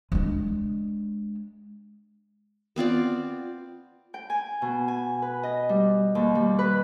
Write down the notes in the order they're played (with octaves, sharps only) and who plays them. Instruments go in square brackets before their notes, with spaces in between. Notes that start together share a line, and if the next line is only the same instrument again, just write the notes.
[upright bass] G#3 D4
[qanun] B3 C4 F4 D5
[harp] G5
G#5
B2
G#5
B4
D#5
G3
D#2
G3
B4